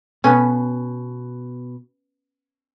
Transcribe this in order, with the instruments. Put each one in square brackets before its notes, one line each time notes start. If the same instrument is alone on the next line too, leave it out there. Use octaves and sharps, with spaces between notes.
[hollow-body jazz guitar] B2 [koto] B3 C#4